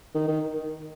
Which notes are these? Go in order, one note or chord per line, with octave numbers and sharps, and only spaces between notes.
D#3
D#3